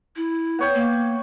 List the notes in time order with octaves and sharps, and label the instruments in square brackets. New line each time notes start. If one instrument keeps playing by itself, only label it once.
[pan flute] E4
[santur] B3 C#5 G5
[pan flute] A#3